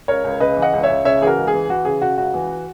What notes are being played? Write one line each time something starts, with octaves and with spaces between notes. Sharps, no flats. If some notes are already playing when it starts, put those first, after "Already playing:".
C#2 A#4 C#5
C#2
C#3 B4 D#5
E3
D#5 F#5
C#2
C#5 E5
C#2
C#3 C#5 E5
E3 F#4 G#4 A#4
C#2
G#4
E3
E3 F#4
C#3 G#4
C#3 F#4
C#2 F#4
E3